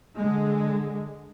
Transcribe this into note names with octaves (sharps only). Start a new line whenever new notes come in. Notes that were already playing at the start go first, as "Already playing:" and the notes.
D3 G#3